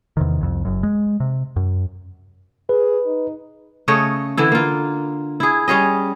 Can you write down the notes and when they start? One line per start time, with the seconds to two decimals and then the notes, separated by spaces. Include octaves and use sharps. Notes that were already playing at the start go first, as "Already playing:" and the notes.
0.17 E2 C3 D#3
0.41 C2 F2
0.65 F#1 F#2
0.83 G#3
1.20 C3
1.56 F#2
2.69 G#4 B4
3.06 D#4
3.88 C#3 A3 C#5 D#5
4.37 D3 E3 E4
4.52 A#3 F4
5.40 E4 G#4
5.68 G3 C#4 G#4 D#5